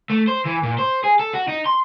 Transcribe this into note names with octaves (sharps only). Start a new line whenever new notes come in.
A3
C5
E3
A#2
C5
G#4
A4
F#4
D#4
C6